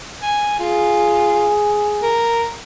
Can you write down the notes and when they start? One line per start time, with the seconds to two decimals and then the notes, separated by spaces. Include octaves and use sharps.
0.23 G#5
0.60 F4 G#4
2.03 A#4